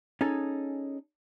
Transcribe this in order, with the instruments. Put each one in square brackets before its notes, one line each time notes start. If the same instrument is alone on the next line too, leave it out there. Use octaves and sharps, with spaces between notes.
[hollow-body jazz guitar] C#4 D#4 G#4 A4